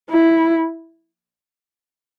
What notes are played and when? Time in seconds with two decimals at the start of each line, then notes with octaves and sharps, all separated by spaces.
0.11 E4